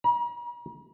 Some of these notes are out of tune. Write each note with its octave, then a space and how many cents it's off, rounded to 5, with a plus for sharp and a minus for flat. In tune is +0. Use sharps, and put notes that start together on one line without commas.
A#5 +45